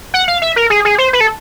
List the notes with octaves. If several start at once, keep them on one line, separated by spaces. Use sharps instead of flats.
F#5
F5
E5
A#4
G#4
G#4
C5
B4
A4